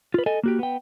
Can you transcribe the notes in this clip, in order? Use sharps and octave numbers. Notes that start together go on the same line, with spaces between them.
F4 B4
A4 D#5 G#5
A#3 F#4 G4
B3 G5